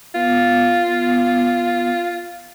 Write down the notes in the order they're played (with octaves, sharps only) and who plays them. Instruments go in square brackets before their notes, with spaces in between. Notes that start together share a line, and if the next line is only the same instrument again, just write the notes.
[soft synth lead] B3 [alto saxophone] F4